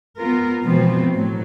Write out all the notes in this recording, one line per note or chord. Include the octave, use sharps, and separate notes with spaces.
B3 F4 A#4
B2 E3 F3 G#3 B3 C4
A2 F#3